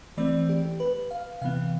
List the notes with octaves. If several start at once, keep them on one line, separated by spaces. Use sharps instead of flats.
E3 A3 C4 D5
G4
B4
F5
C3 E3 B3 F5